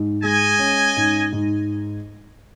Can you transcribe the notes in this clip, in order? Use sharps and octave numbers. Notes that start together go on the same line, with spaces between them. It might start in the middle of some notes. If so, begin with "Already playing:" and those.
Already playing: G#2
G#3 D#5 G#5
C#4
G#2
G#2